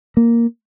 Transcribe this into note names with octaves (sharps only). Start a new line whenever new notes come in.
A#3